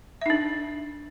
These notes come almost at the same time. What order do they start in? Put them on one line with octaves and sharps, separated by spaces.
E5 D#4 D4